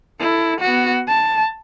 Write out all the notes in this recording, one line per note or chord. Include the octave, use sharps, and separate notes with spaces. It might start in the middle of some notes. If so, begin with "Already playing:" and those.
E4 A4
B3 F#4
A5